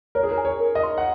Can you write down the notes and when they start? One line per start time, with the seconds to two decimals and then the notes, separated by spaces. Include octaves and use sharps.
0.15 A#4 C#5
0.23 G#4
0.31 A#4
0.38 G#5
0.45 C#5
0.60 A#4
0.75 D#5
0.83 C6
0.98 F#5